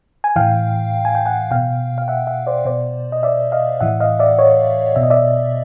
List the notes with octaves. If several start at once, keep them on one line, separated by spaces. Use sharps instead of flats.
G#5
A2 E3 F5 G5
G#5
G5
F#5 G#5
B2 F5 G5
F5
E5 F#5
E5 F#5
C5 D5
B2 C5 D5
D#5
D5 E5
D#5 F5
A2 E3 E5 F#5
D#5 F5
D5 E5
C#5 D#5
B2 E5
D#5
D5 E5